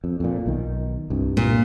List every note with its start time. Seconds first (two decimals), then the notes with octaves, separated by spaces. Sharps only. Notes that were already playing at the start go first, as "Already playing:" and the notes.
0.04 F2
0.20 F2 A#2
0.46 B1 D#3
1.10 C2 G2
1.37 A#2